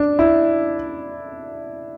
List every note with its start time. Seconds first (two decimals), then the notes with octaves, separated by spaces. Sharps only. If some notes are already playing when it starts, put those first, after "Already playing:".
Already playing: D4
0.19 E4